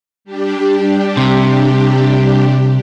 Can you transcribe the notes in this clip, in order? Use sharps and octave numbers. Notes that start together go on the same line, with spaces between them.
G3 D4 G4
C3